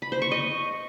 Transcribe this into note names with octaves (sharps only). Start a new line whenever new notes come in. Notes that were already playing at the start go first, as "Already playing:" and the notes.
B5
C5
C#6
D#5